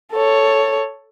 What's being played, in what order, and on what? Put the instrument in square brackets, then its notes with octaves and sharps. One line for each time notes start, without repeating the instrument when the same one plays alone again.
[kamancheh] A4 C#5